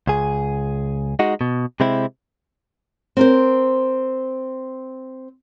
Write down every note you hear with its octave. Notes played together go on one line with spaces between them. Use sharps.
C#2 G#4
G#3 D#4 F#4
B2
C3 G#3 C4 E4
C4 A#4 C5